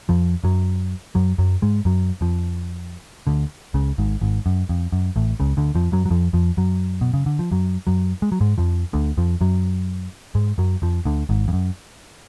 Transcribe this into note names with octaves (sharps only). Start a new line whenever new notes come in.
F2 F3
F#2 F#3
F#2 F#3
F#2 F#3
G#2 G#3
F#2 F#3
F2 F3
D2 D3
C#2 C#3
G#1 G#2
G#1 G#2
F#2
F2
F#2
A1 A2
C#2 C#3
D2 D3
F2 F3
F#2 F#3
F#3
F2 F3
F2 F3
F#2 F#3
B2
C#3
D3
F3
F#2 F#3
F#2 F#3
G#3
F#3
G#2 G#3
F2 F3
D2 D3
F2 F3
F#2 F#3
G#2 G#3
F#2 F#3
F2 F3
D2 D3
G#1 G#2
F2
F#2